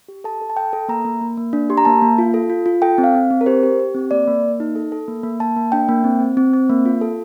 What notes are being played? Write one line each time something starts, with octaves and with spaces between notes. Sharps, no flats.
G4
A4 A5
A4
A5
A4 G5
A4
A#3 A#5
A#3
A#3
A#3
D4
G4 C6
A#5
A#3 A5
A#3
F4
A4
F4
F4
A4 G5
C4
F5
C4
C4
A#4
G4 C5
G4
G4
C4
A#3 D5
A#3
A#3
D#4
A4
A4
A#3
A#3
A#3 A5
A#3
D4 G5
A#3
C4
C4
C4
C4
A#3
F4
A4